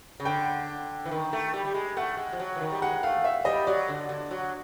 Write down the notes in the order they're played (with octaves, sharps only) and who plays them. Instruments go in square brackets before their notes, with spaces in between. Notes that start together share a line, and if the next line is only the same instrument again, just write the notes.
[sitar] C#3
[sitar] D3 [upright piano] G5
[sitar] E3
D#3
A3
G3
G3
G#3
[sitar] A3 [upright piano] F#5
[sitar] G#3
F3
F#3
E3
D#3
G3
[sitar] G#3 [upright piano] F#5
[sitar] A3 [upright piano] F5
[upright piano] E5
[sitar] G3 [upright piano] D#5
[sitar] F#3 [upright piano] D5
[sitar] D3
D3
F#3